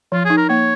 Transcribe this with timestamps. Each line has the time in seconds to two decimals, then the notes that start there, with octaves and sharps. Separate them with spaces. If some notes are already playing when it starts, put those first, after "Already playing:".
0.12 F3 F4
0.25 D#4 G#4
0.37 A#4
0.49 A#3 C#5